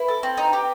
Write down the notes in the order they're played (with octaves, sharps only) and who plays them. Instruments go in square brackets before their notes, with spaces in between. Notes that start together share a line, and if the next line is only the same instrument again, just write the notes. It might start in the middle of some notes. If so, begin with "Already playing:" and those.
Already playing: [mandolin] E4 [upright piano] B4
[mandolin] A4
C4
D#4
G4